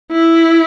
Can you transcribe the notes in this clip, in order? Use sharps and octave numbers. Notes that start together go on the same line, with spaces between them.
E4